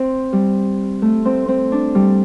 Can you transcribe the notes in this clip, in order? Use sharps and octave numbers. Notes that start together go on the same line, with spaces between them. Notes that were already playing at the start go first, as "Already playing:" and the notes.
Already playing: C4
G3
A3
C4
C4
D4
G3